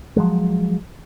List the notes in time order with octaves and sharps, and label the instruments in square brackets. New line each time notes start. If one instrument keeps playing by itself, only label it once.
[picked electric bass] F3 F#3 G#3